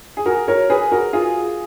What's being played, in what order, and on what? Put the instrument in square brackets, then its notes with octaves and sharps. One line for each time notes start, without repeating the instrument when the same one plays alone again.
[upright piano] G#4
F#4 A#4
A#4 C#5
G#4 B4
F#4 A#4
F4 G#4